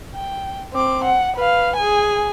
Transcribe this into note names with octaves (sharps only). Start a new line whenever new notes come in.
G5
C4 D6
F#5
B4 F5
G#4 G#5